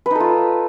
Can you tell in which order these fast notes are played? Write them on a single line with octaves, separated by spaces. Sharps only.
B4 D#4 A4 F4